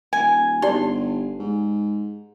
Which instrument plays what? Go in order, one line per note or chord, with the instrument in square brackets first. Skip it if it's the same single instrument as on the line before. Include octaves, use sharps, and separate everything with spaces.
[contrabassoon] D#1 [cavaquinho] G#5
[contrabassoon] G1 [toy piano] D#4 G4 D5 [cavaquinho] C6
[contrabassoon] G#2